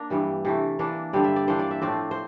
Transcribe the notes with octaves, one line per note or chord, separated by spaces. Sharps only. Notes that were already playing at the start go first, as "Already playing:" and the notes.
Already playing: A#3 D4 A#4
G2 E3 G3
C3 E3 A3
E3 A#3 D4
G2 D3 G3 C4 D5
E5
D5
E3 A#3 D4 C5
D5
E5
A2 F3 A3 C4 D5
C5